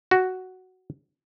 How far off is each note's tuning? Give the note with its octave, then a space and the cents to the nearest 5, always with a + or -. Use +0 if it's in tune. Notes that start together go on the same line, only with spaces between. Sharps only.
F#4 +5